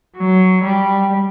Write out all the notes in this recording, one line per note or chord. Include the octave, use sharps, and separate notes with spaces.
F#3
G3